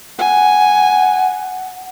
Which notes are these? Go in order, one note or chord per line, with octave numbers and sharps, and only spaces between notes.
F#5 G#5